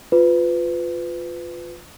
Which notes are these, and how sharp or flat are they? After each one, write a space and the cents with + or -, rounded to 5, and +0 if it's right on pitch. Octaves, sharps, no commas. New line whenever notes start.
F4 +10 B4 +25